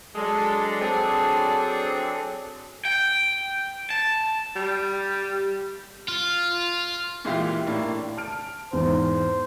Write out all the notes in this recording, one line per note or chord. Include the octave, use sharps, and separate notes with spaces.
F#3 G#3 D4 A4
C4 G#4
G5
A5
G3
F4
A#2 E3 G#3 E4 F4 G4
A2 A#3 D4
A5 F6 D7
E2 G#2 C5